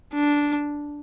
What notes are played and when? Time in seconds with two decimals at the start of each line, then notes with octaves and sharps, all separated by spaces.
0.14 D4